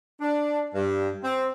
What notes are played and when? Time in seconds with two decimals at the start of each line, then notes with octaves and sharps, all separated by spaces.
0.21 D4
0.75 G2
1.23 C4